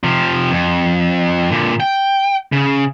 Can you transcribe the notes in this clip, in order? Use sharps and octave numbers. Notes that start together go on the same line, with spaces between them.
C3 F3
F2
A#2 D3
G5
C#3